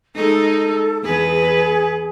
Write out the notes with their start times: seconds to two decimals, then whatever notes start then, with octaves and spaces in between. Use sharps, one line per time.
0.16 G#3 D#4 A4
1.03 E2 B3 G#4 B4